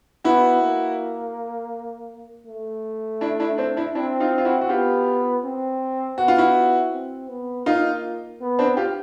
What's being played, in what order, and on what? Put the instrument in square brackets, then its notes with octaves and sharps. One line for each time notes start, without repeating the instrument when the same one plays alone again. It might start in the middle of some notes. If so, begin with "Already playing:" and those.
[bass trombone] B3 [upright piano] E4 F#4
[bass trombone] A#3
A3
[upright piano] D4 E4
D4 E4
C4 D4
D4 E4
[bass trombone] C4 [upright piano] D4 E4
[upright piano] D#4 F4
F4
E4 F#4
F#4
[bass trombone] B3 [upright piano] F4 G4
[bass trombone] C4
[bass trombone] B3 [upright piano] F#4
[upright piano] F4
E4 F#4
[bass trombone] C4
B3
[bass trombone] A#3 [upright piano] D#4 F4
[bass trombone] B3
[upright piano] C4 D4
F4 G4